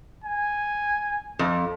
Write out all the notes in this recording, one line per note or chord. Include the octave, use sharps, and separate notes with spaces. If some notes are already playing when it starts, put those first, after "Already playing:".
G#5
F2